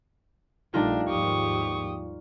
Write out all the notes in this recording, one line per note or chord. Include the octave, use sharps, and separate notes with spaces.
A#1 G3 A3 D4 D#4 F4
D#2 G#2 F3 G4 C#6 D#6